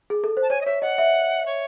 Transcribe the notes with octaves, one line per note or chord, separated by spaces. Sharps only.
G#4
A4
C5
A5
C#5 G#5
D#5
C#5 E5
D#5 F#5
E5
C#5